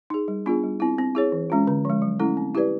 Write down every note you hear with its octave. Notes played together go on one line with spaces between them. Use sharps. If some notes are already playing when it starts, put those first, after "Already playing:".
D#4 G#4
G3
B3 D4 F4 G#4
G3
C4 E4
C4
E4 G#4 C#5
E3
G#3 C#4 F4
D3
F3 G#3
F#3
A3 C#4 E4 A4
C4
E4 G4 B4 D5